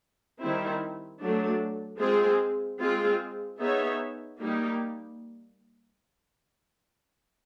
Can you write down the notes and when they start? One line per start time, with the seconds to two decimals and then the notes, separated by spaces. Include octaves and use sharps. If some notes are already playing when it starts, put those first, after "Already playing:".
0.40 D#3 G3 C4 E4
1.20 F#3 A3 D4
2.00 G#3 C4 F4 G#4
2.80 G#3 C4 F4 G#4
3.60 B3 D#4 G#4 C#5 E5
4.39 G3 A#3 D#4 G4